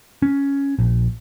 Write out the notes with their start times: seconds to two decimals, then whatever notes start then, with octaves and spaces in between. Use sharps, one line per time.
0.22 C#4
0.79 A#1